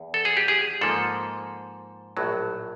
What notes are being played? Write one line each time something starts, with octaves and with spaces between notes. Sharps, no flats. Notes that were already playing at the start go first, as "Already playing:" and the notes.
Already playing: E2
A4
G#4
G4
G#4
G#2 F3 A#3 A4
A#1 A2 F#3